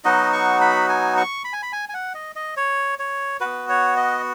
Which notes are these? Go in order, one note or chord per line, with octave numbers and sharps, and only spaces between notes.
F#3 B3 D#4 F#4 D#5
C#6
B5
G#5
C#6
B5
G#5
B5
G#5
G#5
F#5
D#5
D#5
C#5
C#5
B3 F#4 B4
C#5
D#5